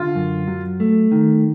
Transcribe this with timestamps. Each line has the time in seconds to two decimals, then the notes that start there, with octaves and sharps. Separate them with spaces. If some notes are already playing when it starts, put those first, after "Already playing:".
Already playing: D3 F4
0.15 F#2
0.47 F#3
0.80 A3
1.11 D#3